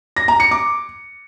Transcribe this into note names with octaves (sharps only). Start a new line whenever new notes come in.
A#6
A#5
C#7
D6